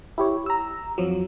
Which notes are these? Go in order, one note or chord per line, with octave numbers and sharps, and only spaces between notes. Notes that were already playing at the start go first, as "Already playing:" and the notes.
E4 G4 C#5
A#5 E6
F2 F3 F#3